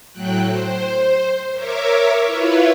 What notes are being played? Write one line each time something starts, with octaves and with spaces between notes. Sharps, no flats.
A2 F#3 G5 F#6
C5
A#4 C#5 E5 D6
E4 F4 B4 C#5